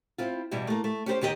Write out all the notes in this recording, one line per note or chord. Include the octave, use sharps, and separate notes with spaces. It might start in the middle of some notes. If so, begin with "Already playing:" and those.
C4 E4 F4
E2 B2 G3 E4
A3 A#3
A3
C#4 G4 A#4 C5
D#2 D#3 G4 G#4 D#5